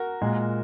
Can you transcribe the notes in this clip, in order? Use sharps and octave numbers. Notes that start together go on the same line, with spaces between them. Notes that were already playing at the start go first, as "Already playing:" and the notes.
Already playing: F#4 A#4
A#2 G#3